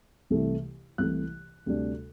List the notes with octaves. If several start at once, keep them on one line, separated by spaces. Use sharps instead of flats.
C2 C3 E3 A3
C2 C3 E3 A3 F#6
D2 C3 G3 D4